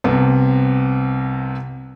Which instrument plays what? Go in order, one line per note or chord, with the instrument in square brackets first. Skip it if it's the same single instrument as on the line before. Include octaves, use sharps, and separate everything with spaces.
[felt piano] C2 C3 B3